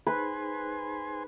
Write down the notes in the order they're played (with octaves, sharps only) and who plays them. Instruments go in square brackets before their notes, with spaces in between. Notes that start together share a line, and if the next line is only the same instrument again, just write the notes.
[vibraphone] D#4 G#4 C5 [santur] B4 [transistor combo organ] G#5 C6